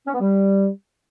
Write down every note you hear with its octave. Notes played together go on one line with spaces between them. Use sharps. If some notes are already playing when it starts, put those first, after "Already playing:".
C#4
B3
G3